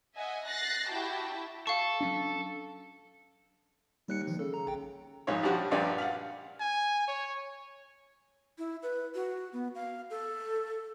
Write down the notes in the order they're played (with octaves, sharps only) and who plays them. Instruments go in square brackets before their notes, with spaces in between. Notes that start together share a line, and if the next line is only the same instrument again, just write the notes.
[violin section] D#5 E5 F#5 G#5
F#6 A6 A#6 C7
E4 F#4 G4 G5 A5
[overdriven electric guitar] A4 [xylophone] F5 C#6
[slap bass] F#3 C#4 D4
[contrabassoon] D#2 [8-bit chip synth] G3 F#6 C#7
[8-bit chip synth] D#3 F3
[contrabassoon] C#3 [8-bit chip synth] A4
[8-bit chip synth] A#5
A1 G5
[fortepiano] A#1 G#2 C#5
F3 G3 D4 F#4
A#1 G2 D5
F5 F#5
[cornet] G#5
C#5
[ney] E4
B4
F#4
B3
F5
A4